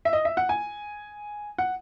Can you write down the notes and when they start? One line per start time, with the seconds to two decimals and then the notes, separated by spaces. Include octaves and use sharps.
0.05 E5
0.13 D#5
0.25 E5
0.37 F#5
0.49 G#5
1.58 F#5